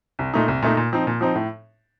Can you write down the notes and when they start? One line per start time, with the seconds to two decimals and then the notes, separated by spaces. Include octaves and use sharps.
0.19 C2
0.34 A#2 A3 D#4
0.48 C2
0.62 A#2 A3 D#4
0.77 A#2
0.92 F3 C4 D#4
1.07 A#2
1.21 F3 C4 D#4
1.35 A2